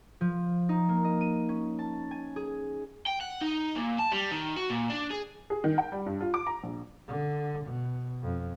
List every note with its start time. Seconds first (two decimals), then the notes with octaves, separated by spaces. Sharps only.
0.21 F3
0.69 D#4
0.89 A#3
1.04 D#5
1.21 D#7
1.49 C#4
1.79 A5
2.11 G#5
2.36 G#4
3.06 G5
3.21 F#5
3.41 D#4
3.76 A#2
3.99 A5
4.12 G3
4.32 D#3
4.56 F#4
4.70 A#2
4.90 D4
5.11 G#4
5.50 G#4
5.64 D#3
5.78 G5
5.92 G3
6.06 G2
6.21 F4
6.34 D6
6.47 A#5
6.63 A#1
7.08 D3
7.65 B2
8.23 F2